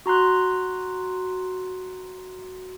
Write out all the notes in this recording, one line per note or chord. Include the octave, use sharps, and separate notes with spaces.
F#4 A#5 C6 F#6